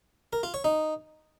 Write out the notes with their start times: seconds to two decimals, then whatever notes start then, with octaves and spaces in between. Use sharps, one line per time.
0.33 A#4
0.43 F4
0.54 C#5
0.64 D#4